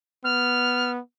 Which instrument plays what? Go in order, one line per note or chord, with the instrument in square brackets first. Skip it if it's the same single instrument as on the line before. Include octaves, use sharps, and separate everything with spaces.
[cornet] B3 [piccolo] F6